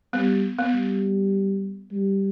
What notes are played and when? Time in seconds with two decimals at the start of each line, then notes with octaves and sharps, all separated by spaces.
0.13 G3 B3
0.58 B3
0.73 G3
1.92 G3